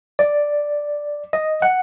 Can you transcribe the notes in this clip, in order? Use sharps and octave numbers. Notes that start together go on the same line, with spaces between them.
D5
D#5
F#5